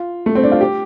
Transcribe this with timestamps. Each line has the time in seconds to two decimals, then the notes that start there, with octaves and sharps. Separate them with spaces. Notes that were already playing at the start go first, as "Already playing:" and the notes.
Already playing: F4
0.26 A3
0.35 C4
0.44 D4
0.52 F4
0.61 G4